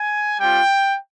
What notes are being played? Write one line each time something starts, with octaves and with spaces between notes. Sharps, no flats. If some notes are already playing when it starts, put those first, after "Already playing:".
Already playing: G#5
G3 C4 F4 G5